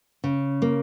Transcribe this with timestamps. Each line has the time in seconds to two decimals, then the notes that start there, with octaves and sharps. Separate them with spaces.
0.24 C#3
0.62 A#3